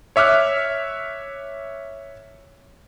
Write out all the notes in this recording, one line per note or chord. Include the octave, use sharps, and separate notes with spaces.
C#5 E5 D6 F6 F#6